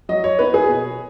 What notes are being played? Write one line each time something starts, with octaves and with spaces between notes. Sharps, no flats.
F#3 D#5
C#5
B3 D#4 B4
G#4
B2